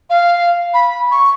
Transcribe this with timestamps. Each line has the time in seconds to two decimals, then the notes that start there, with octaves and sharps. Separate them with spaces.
0.10 F5
0.74 B5
1.12 C#6